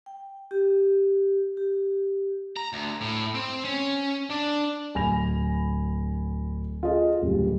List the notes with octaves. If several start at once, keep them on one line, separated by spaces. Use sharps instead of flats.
G5
G4
G4
A#5
D2
A2
C4
C#4
D4
D1 G#5 B5 A#6 F7
F4 G#4 A4 D#5
D1 C#2 G3